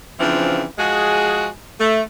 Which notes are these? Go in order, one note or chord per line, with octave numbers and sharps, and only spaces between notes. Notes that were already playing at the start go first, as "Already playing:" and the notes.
C#3 E3 F3 C4 D4
F3 G#3 F#4 G#4
A3